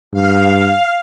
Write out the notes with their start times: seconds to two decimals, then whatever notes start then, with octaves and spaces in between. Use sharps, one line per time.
0.13 G2 F5